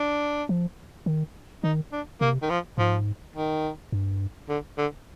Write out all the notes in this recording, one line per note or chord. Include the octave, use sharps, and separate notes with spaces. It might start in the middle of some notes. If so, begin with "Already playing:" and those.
Already playing: D4
F3
D#3
D#3 D#4
D4
C3 A#3
D#3
F3
G#2 F3
D#3
G2
D3
D3